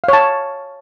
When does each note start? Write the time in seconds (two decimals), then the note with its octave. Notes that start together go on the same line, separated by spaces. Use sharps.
0.04 F5
0.08 C#5
0.13 A5